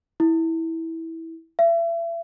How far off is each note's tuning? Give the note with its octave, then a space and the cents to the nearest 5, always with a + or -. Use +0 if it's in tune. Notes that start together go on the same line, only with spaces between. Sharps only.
E4 -15
E5 +35